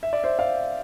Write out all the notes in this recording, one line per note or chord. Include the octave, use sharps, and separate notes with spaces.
E5
D5
C5 E5
D5 F5